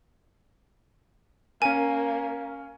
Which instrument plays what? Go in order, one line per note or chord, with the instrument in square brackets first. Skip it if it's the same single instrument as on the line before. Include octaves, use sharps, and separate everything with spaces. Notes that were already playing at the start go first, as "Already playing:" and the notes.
[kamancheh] A#3 [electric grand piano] C#4 A#4 [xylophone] G#5